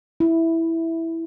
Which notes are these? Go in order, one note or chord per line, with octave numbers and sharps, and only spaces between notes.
E4